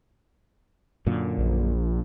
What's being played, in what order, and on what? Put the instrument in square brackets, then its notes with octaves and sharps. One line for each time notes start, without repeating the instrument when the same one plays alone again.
[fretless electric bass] F#2 A#2 D3
[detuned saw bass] A#1